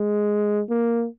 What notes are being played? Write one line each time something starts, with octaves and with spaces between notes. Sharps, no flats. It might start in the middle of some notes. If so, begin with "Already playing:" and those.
Already playing: G#3
A#3